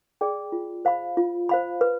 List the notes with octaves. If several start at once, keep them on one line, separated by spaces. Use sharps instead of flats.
G#4 D5 G5
F4
C5 F5 B5
F4
C5 F5 B5
B4